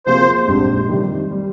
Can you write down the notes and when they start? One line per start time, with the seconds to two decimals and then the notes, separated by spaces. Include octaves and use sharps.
0.06 C3 F3 A#3 F4 G#4 C5
0.47 A#1 G#2 G3 C4 G4
0.87 F2 C3 D#3 G3
1.31 G3